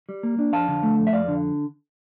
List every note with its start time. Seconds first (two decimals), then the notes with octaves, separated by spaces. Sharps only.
0.09 G3
0.23 A#3
0.39 D4
0.53 F2 F5 A5
0.68 D3
0.83 A3
0.98 F2
1.07 E5
1.13 F2 D5 F5
1.28 D3